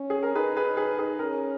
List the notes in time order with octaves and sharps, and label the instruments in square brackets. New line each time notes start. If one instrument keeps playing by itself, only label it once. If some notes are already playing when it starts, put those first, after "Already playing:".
Already playing: [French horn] C#4
[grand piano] G#4
A#4
[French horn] D#4 [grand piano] G#4 B4
[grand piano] G#4 B4
G#4 B4
G#4
[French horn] C#4 [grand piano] A#4